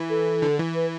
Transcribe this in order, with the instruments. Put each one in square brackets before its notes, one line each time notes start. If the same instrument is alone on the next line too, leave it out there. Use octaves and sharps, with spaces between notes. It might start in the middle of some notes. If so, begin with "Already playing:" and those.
Already playing: [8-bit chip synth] E3
[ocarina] A4
[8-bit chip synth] D3
E3
[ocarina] B4